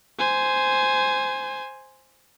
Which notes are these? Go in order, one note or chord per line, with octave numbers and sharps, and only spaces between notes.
C5 G#5